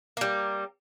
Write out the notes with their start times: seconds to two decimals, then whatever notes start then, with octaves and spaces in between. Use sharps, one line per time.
0.17 G3 A#3